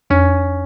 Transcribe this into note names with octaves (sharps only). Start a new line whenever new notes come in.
F2 C#4